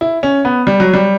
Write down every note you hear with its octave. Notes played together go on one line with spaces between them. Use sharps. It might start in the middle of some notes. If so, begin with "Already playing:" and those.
E4
C#4
B3
G3
F#3
G3